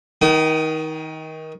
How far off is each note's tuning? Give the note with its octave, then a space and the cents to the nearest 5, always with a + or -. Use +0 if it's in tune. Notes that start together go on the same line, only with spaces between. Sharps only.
D#3 +25 G5 -40 D#6 +0